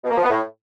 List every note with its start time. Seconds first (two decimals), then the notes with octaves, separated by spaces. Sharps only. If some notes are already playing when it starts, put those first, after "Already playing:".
0.04 B2
0.11 A#3
0.17 F3
0.23 B3
0.30 A2